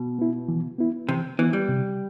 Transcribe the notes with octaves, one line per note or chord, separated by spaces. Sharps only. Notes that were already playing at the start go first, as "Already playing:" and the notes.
Already playing: B2
B3 E4
E3
B3 E4
C3 E3
E3 B3 E4
G3
C3